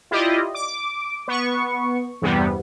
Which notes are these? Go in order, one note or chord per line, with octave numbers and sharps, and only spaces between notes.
E4 F4 G4 D5 D#5
D6
B3 C#6
E2 G2 C3 G3 B3